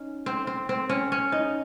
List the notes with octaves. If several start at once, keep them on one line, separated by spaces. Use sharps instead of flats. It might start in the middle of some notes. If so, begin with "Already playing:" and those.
Already playing: C#4 D#4
C4
C4
C4
C#4
C#4
D#4